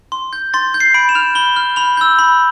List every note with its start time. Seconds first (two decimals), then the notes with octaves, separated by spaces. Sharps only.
0.12 C6
0.33 G6
0.54 C6 A6
0.74 G6
0.80 C7
0.94 B5 D7
1.09 E7
1.15 F6 F7
1.35 B5 G7
1.56 F6
1.76 B5 F7
1.97 E6 G6
2.19 B5